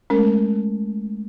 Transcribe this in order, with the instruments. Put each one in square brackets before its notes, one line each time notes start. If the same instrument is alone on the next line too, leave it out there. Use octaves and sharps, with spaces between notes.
[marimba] G#3 A3 [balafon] C#4 A#4